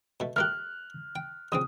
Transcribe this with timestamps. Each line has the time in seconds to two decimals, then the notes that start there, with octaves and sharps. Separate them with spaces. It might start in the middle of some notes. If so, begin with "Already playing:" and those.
0.20 B2 A3
0.36 A3 A#3 G4 F6 F#6
1.16 G5
1.52 A#1 C#3 C4 D#6